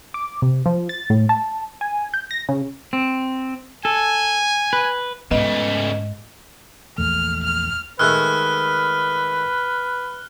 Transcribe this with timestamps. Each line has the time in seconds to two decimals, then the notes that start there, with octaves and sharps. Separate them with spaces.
0.14 D6
0.42 C3
0.66 F3
0.89 A6
1.10 A2
1.29 A5
1.81 G#5
2.14 G6
2.31 A#6
2.49 C#3
2.93 C4
3.85 A4 G#5
4.73 B4
5.31 G#2 C#3 A3 B3 D#5
6.98 A#1 E2 A3 F6
7.44 F6
7.99 D#3 G#3 A3 B4 F6 F#6